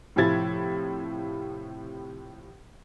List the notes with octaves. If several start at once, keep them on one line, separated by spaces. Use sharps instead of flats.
A2 C3 F3 E4 G#6 A6